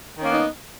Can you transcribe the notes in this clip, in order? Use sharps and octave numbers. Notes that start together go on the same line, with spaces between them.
D#3 A#3 B3 C#4 D#4